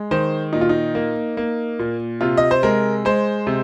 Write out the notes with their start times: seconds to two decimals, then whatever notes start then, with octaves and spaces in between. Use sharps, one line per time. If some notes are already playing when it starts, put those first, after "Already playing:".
Already playing: G#3
0.11 D#3 C5
0.53 A#2 D#4
0.61 F4
0.69 D#4
0.95 A#3
1.37 A#3
1.79 A#2
2.21 C3 F4
2.37 D#5
2.51 C5
2.63 G#3 A#4
3.05 G#3 C5
3.47 C3